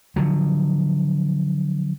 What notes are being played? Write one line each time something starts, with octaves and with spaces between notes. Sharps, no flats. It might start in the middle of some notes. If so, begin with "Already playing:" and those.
D3 F3 F#3